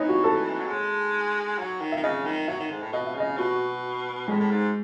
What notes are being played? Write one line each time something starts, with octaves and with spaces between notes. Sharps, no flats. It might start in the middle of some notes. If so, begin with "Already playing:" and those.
Already playing: E3 D#4 C#5
F#4
A4
F#3
G#3
F#3
D#3
D#3 E5
C#3 D#5
D#3
F#3 E5
D#3
G#2
A2
B2 D#5
E5
C#3 D#5
B2 F#4
A2 G#3
A2
G#2